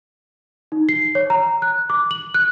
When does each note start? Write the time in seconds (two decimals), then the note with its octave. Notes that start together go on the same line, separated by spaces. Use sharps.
0.72 D#4
0.89 C7
1.15 C#5
1.30 A#5
1.62 F#6
1.90 D6
2.11 F#7
2.34 F#6